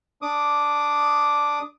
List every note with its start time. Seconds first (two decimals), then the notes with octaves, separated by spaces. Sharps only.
0.22 D4 D6 D#6